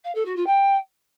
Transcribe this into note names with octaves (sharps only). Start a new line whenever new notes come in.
F5
A4
F#4
F4
G5